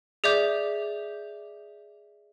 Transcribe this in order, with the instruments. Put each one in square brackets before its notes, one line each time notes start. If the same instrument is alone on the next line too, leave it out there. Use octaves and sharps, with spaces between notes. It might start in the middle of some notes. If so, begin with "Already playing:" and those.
[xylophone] G#4 D5 E5 D6 G6